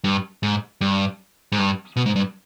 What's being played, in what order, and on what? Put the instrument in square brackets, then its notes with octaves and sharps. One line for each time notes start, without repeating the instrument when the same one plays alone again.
[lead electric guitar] G2
G#2
G2
G#2
G2
B2
G#2
G2